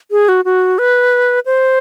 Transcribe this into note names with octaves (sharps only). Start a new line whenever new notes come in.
G#4
F#4
F#4
B4
C5